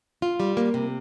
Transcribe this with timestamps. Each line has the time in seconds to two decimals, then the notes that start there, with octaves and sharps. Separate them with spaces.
0.22 F4
0.40 G3
0.57 A#3
0.74 C3